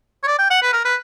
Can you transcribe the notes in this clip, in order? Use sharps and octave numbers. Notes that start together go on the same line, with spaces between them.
C#5
D5
G5
F#5
B4
A#4
B4